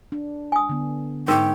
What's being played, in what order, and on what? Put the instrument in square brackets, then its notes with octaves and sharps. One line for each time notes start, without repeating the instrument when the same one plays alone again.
[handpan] D4
[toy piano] G#5 D#6
[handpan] D3 B3
[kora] G#2 C#5 [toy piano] A#4 [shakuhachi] G5